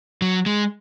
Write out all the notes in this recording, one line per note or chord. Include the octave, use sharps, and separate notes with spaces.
F#3
G#3